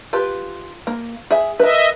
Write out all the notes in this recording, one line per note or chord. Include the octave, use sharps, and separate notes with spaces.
F4 G4 B4
A#3
G#4 E5
A#4 B4 D#5 E5